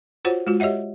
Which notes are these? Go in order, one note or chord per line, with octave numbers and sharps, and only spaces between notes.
F4 F#4 C5 C#5 F#5
G#3 F4 F#4
G4 C#5 D#5 E5 F#5